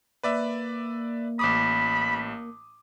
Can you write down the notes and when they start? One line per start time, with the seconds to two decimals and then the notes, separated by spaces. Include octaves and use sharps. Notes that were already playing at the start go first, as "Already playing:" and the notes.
0.23 A#3 B4 D5 E5
1.39 A1 B5 D6 D#6